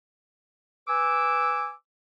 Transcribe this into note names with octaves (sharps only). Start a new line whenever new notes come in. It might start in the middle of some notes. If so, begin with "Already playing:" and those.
B4 G#5 D6 E6